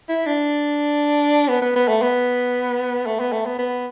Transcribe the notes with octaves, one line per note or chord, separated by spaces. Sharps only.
E4
D4
B3
B3
B3
A3
B3
A3
B3
A3
B3
B3